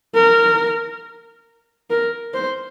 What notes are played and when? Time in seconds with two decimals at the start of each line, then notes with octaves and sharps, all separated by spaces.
0.15 A#4
1.90 A#4
2.34 C5